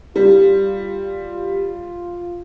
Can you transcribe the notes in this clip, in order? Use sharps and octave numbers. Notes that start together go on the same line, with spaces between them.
G3 F4